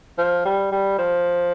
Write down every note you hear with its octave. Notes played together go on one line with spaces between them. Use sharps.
F3
G3
G3
F3